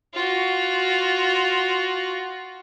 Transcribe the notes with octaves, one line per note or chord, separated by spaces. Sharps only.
F4 F#4